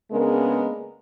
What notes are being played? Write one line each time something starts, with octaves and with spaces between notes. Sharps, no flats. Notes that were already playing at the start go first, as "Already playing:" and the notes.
C#3 G#3 A#3 B3 D4 A#4